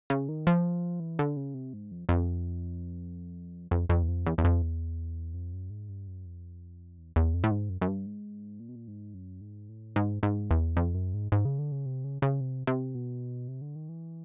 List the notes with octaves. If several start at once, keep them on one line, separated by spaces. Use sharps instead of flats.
C#3
D#3
F3
E3
D3
C#3
C3
G#2
F2
F2
F2
F2
E2
F2
E2
E2
F2
E2
F2
F#2
G#2
G2
F#2
F2
E2
E2
F2
A2
G#2
F#2
F#2
G2
G#2
A#2
B2
A#2
G#2
F#2
G#2
A2
G#2
G#2
E2
F2
F#2
G#2
G#2
C#3
D3
C#3
C3
C#3
C#3
C3
C3
B2
C3
D3
D#3
E3